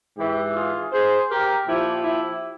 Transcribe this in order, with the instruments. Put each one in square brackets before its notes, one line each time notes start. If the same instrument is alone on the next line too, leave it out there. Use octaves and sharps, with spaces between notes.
[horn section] G#2 E3 E4 G4
F4 G#4
G#4 C5
G4 A#4
A#2 F3 E4 G4
E4 G4